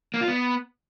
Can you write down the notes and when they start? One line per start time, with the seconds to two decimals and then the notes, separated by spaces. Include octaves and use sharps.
0.14 A#3
0.21 F4
0.28 B3